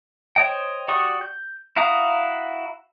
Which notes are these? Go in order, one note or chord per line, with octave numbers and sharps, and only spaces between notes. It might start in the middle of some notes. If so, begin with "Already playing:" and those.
C5 C#5 D#5 G5
F#4 G4 D5 C#6 D#6
G6
E4 F#4 F5 A#5 D#6